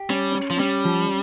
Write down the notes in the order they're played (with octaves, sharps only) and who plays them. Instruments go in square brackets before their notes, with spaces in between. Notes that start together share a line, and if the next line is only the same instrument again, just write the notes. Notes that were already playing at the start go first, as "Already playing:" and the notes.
Already playing: [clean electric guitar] G4
[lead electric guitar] G3 [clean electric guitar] C#4
[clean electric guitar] C#4
[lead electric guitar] F3
[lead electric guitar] G3 [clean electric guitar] C#4
[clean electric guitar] F3